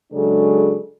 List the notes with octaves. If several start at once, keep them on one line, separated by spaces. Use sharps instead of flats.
C#3 F#3 G#3 D4 A4